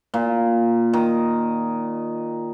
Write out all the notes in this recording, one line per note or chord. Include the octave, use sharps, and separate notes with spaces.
A#2
D#3